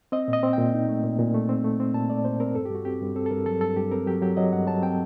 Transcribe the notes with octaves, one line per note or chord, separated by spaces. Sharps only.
C4 D#5
A#2
D#5
C4
A#2 G5
D#4
A3
A#2
A#2
A3
C4
A3
C4
A#2 A5
A3 D5
A#2 C5
C4 A#4
G2 A4
G4
G2 F#4
C4 G4
G2
C4 A4
A4
G2 A#4
F#3 A4
G2 A4
G2 G4
C4 A#4
F#3 G4
F#3 G4
F#3 D#5
G2 F#5
F#3 A5
C4 G5